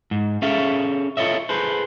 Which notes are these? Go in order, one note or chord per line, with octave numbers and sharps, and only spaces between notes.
G#2
C#4 G#4 A4 E5 F5
F4 A4 C#5 D#5 E5
G#4 A4 B4 C5